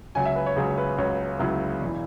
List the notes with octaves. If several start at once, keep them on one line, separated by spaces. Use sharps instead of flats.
C#2 C#3 F#3 G#5
E5
B4
C#5
C#2 C#3 F#3 G#4
B4
C#2 C#3 F#3 C#5
C#2 C#3 F#3 E4
E1 E3